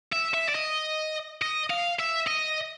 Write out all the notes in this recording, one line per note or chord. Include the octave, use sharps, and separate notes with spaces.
E5
E5
D5
D#5
D#5
F5
E5
D#5